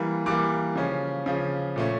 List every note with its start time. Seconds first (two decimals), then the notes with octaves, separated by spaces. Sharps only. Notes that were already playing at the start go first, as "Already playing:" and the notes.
Already playing: E3 G3 A#3
0.26 E3 G3 A#3 D6
0.76 C#3 F3 C#4
1.26 C#3 F3 C#4
1.76 A#2 A3 C#4